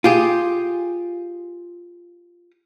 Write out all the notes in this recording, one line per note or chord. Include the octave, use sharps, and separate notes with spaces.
F4 G4 G#4